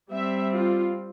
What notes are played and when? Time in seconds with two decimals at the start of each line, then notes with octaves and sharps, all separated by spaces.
0.11 G3 C4 E5
0.53 F4